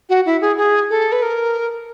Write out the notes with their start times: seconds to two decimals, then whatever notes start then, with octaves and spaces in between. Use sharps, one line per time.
0.09 F#4
0.26 E4
0.41 G#4
0.57 G#4
0.90 A4
1.12 B4
1.22 A#4